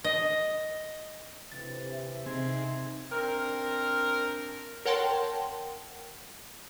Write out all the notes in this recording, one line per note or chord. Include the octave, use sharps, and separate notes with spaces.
D#5
D2 C3 E3 A6
E5
C3 C4 D#4 G#4
C4 D4 A#4
A#4 C#5 F#5 G5 A5 C6